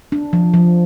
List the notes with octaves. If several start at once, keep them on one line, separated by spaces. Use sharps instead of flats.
D4
F3
F3